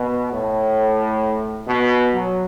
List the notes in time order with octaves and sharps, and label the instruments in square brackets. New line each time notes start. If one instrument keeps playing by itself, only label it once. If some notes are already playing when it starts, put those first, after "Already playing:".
Already playing: [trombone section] B2
A2
B2
F#3